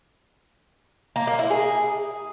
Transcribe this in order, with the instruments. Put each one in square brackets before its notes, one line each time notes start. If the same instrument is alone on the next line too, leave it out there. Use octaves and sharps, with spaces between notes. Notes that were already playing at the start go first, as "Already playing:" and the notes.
[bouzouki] A#3
A#3
E4
G#4